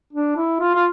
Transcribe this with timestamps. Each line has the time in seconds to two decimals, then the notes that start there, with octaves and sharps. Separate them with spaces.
0.13 D4
0.37 E4
0.60 F4
0.75 F4